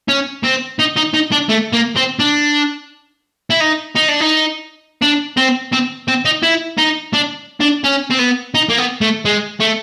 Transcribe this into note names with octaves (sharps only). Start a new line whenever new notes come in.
C#4
C4
D#4
D#4
D#4
D4
A3
A#3
C4
D4
E4
D#4
D#4
D4
D#4
D4
C4
C4
C4
D#4
E4
D#4
D4
D4
C#4
C4
B3
D#4
A#3
B3
A3
G#3
A3